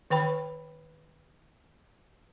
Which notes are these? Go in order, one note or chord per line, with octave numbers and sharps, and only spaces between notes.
D#3 B4 G5 B5